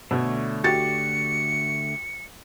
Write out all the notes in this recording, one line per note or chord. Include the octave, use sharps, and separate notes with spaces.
B2 D3 A3 C#5
F#4 G4 A6 C#7